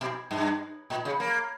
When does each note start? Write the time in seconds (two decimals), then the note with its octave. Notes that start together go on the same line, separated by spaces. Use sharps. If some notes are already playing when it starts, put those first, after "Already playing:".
0.01 B2
0.31 G2
0.90 A#2
1.05 C#3
1.20 A#3